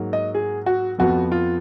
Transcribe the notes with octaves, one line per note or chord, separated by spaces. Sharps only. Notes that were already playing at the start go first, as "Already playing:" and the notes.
Already playing: G#2 F#3 A#3
D#5
G#4
F#4
F2 F3 B3 F#4
F4